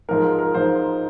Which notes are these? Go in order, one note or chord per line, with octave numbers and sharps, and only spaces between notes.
G#2 F3 G#3 A#4
A#4
G#2 F3 G#3 C5